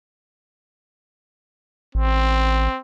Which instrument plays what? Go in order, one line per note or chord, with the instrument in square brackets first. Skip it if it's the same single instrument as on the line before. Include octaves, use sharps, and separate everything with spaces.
[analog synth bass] A1 [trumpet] C4